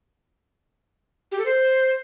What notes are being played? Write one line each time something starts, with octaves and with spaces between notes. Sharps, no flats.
G4
A4
C5